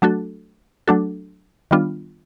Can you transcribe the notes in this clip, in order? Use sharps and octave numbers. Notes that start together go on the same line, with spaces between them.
F#3 A3 D4 F#4 A4
F#3 A3 D4 F#4 A4
D#3 G3 B3 D4 F4